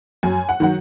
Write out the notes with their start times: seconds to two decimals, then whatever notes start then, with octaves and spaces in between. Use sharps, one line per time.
0.23 F#2 G#5
0.49 F#5
0.60 D#3 F#3 F#5